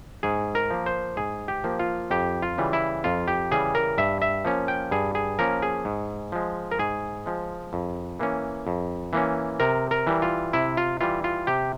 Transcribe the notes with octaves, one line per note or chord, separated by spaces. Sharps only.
G#2 G#4
A#4
F3 A#3
C5
G#2 G#4
G4
F3 A#3
F4
F2 G4
F4
C#3 E3 G3
E4
F2 F4
G4
C#3 E3 G3 G#4
A#4
G2 E5
E5
F3 A#3 C#4
G5
G2 G#4
G#4
F3 A#3 C#4 A#4
G#4
G#2
F3 G#3
A#4
G#2 G#4
F3 G#3
F2
E3 A#3 C#4
F2
E3 A#3 C#4
C3 A#4
A#4
E3 G3
F4
C3 E4
F4
E3 G3 F4
F4
C3 G4